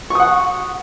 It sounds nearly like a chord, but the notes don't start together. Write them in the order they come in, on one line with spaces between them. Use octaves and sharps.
C#6 D#6 F#5